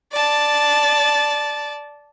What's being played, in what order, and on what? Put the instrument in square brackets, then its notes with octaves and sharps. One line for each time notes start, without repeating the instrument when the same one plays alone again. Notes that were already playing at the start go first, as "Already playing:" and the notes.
[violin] D5 A5